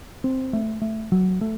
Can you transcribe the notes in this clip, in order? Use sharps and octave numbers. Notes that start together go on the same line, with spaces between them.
C4
A3
A3
F#3
A3